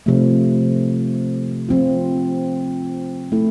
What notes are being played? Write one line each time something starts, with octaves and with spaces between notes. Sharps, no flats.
C3 F3 A3
F3 C4 F4
A3 E4 A4